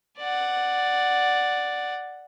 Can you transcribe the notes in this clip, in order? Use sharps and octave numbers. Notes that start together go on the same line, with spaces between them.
D5 F#5